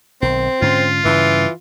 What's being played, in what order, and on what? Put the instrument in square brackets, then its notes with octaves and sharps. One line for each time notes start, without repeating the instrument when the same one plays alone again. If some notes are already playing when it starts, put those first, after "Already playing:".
[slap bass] B1 D#3 [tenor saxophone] C4
[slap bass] G#2 D3 C#4 [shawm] F4
[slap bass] G2 C#3 [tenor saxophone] E3